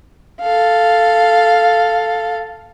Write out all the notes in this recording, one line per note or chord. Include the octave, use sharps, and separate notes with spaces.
A4 F5